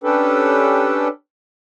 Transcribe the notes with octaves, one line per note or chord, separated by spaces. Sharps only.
C#4 D4 G4 A4 B4